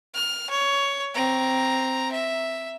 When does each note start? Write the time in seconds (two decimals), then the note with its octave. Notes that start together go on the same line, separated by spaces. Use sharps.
0.14 F6
0.50 C#5
1.14 C4 A#5
2.12 E5